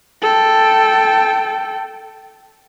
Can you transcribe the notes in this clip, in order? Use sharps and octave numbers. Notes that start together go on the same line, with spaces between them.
A4 G5